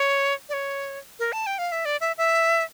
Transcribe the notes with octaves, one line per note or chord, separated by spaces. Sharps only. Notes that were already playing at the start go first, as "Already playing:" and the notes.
Already playing: C#5
D5
C#5
A#4
A5
G5
F5
E5
D5
E5
E5